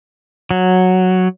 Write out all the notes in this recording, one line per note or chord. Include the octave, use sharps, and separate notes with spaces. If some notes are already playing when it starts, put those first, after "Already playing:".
F#3